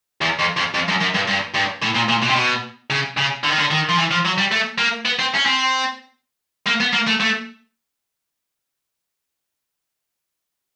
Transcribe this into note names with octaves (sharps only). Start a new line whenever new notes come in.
E2
F2
F2
F2
F#2
F#2
G2
G2
G2
A2
A#2
A#2
B2
C3
B2
C#3
C#3
D3
D#3
D3
D#3
F3
E3
F3
F#3
G3
A3
A#3
B3
C4
C#4
C4
A#3
B3
A#3
A3
A3